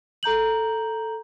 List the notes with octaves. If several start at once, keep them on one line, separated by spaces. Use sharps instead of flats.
A4 A#5 G6 F#7